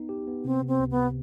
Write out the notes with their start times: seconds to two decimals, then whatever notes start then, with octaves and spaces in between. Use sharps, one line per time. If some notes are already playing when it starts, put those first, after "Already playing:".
Already playing: B3 D#4
0.09 G4
0.27 B3
0.45 C3 C4
0.62 C3
0.68 C4
0.79 C#2
0.91 B3
0.97 C3